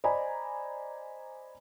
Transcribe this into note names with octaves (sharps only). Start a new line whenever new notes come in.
C5 D5 D#5 G#5 A#5 B5